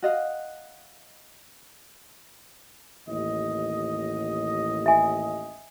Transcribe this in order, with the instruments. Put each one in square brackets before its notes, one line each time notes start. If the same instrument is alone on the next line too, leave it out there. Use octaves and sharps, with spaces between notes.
[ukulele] F#4 D#5 F5
[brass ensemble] A1 D#2 D#5
[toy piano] E5 G#5